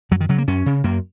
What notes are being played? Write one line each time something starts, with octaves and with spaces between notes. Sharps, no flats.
F#2 F#3
D#3
C#3 F#3
A#3
F#2 C#4
C#3
F#2 A#3